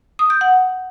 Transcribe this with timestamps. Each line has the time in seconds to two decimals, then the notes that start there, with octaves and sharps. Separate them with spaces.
0.19 D#6
0.30 G6
0.41 F#5